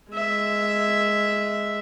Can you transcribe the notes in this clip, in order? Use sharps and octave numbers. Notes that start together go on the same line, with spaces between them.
G#3 E5